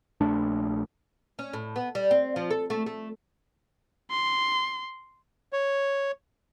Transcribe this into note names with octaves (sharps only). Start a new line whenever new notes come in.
A#1 A3 D4
C#4
A2
B3
G3
C4
F3
A4
A3
A3
C6
C#5